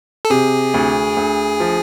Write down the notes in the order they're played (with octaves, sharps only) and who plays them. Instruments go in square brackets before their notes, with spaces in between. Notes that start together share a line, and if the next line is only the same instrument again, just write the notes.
[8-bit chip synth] A4
[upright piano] C3 [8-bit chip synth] G#4
[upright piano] D2
D2
F3